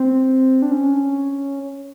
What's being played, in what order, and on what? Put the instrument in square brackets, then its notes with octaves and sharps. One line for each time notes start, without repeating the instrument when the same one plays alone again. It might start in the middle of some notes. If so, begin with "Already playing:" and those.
Already playing: [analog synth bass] C4
D4
C#4